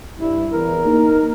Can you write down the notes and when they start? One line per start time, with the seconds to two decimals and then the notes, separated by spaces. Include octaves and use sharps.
0.19 G2 E4
0.52 E2 A#4
0.85 A#3 D#4